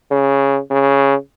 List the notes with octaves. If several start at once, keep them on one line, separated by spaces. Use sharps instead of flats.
C#3
C#3